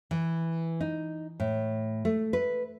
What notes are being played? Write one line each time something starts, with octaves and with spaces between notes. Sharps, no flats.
E3
D#4
A2
A3
B4